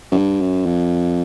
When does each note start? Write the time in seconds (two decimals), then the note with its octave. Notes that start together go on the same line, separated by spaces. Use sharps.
0.12 F#2
0.17 G2
0.41 F#2
0.66 F2